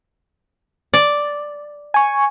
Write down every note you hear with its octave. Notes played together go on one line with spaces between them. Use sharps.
D5
G#5 C#6